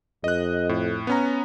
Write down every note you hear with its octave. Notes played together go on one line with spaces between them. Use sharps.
F2 D#5 F#6
A2
B3 C#4 A#5